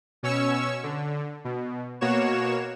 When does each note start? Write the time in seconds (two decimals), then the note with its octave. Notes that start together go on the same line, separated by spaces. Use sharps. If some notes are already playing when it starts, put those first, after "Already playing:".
0.23 B2 C#4 C#5 C#6 E6
0.83 D3
1.45 B2
2.01 B2 A#3 F#4 C#5 E7